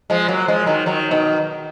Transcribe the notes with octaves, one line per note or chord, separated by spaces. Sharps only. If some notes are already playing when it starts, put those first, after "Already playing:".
F3 G#3
F#3 A#3
F3 G#3
D#3 F#3
D#3 F#3
B2 D#3